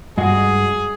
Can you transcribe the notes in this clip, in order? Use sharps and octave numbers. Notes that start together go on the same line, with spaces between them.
G2 G#3 F#4 G#4